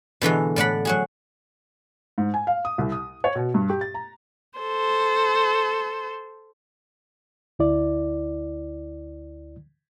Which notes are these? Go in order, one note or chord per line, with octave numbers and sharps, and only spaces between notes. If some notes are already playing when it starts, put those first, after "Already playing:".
B2 D3 E3 G#3
A2 D5 F#5 B5
F#3 F#4 G#4
G#2
G#5
F5
D#6
C2
D#6
C#5
B2
G2
G4
A6
A#5
A4 C5
D2 E4 D5